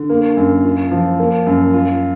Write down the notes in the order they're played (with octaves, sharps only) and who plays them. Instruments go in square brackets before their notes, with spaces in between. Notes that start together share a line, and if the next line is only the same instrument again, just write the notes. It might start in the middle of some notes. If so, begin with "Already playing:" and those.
Already playing: [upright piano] D3
A#3
F#2
F4
F3
A#3
F#2
F4